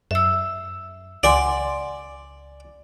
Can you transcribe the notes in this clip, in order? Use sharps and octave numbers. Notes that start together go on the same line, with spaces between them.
F#2 E5 E6
C#2 D5 F#5 G#5 C6